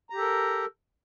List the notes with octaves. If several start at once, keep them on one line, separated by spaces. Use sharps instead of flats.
G4 A4 A#4 A#5